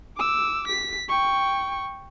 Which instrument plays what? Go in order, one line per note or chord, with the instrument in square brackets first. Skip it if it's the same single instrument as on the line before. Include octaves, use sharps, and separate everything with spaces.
[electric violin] D6 E6
B6
G5 C#6